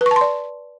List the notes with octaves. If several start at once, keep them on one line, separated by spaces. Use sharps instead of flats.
B4
C#6
A5
C6
D5